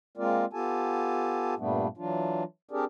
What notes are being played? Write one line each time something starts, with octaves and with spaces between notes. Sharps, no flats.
G#3 A#3 C4 F4 A#4 D5
B3 F4 G4 A4 G#5 A5
G2 A#2 G3 A3 B3 D4
E3 F#3 D4 F4
C4 D4 G4 G#4 A#4 D5